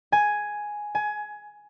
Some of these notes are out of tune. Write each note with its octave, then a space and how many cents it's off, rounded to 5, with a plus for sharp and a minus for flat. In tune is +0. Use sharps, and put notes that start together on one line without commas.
G#5 +5
G#5 +20